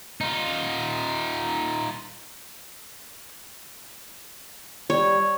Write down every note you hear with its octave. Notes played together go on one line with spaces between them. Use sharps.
D#4 F4
G3 C#5